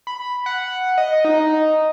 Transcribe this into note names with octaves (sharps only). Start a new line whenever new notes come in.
B5
F#5
D#5
D#4